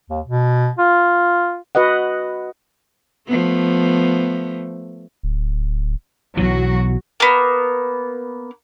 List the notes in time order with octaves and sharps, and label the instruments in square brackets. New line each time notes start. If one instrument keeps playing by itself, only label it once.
[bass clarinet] D#2
B2
F4
[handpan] F#4 B4 D#5 F#5
[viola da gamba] F3 A3 B3
[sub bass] D1
[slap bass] B1 B2 E3 [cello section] F#3 F#4
[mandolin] A#3 B3